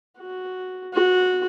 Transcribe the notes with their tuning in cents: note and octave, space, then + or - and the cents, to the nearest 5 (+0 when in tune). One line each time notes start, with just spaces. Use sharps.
F#4 +0
F#4 -15